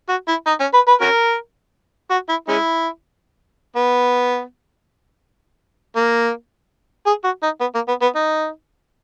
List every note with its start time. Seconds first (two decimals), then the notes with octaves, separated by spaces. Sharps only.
0.09 F#4
0.28 E4
0.47 D#4
0.60 C#4
0.74 B4
0.88 B4
1.01 C#4 F#4 A#4
2.11 F#4
2.29 E4
2.48 G#3 C#4 E4
3.76 B3
5.96 A#3
7.06 G#4
7.24 F#4
7.43 D#4
7.60 B3
7.75 A#3
7.88 B3
8.02 B3
8.16 D#4